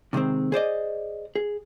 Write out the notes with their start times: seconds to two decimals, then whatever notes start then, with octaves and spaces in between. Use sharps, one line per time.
0.13 C3 D#3 G3 G#3 C4
0.52 G#4 C5 D5 D#5
1.36 G#4